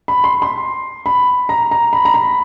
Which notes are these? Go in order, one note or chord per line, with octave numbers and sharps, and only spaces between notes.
B5
C6
C6
B5
A#5
A#5
B5
A#5
B5